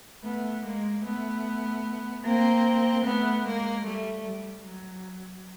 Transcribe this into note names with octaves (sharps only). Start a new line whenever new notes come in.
A3 B3
G#3 A#3
A3 B3
A#3 C4
A3 B3
G#3 A#3
G3 A3
G3
F#3